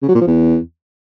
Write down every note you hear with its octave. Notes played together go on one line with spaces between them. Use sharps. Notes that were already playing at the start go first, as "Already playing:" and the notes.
C#3
F#3
A#2
F3
E2